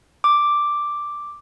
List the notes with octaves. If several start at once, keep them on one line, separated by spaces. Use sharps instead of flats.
D6